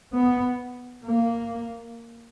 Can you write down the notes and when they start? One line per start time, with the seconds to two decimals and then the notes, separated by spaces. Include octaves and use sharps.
0.14 B3
1.05 A#3